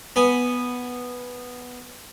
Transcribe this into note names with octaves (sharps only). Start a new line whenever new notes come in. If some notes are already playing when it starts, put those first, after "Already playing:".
B3 G#5